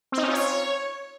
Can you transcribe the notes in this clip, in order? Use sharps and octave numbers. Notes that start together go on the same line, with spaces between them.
C4
D#4
C#4
F4
C#5